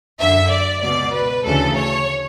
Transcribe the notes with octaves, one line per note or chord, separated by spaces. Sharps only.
F#2 D3 E5
D5
C#2 B2 D5
B4
D2 C#3 E3 A4
C#5